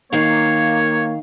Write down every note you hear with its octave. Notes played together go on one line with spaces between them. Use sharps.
D#3 A#3 C#5 F5